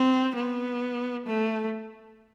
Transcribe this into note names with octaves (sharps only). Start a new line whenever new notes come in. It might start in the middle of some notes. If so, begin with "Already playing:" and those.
Already playing: C4
B3
A3